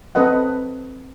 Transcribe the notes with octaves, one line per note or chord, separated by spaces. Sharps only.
C4 A4 B4 D#5 F#5